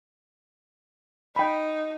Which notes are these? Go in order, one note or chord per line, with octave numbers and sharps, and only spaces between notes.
D#4 G5 B5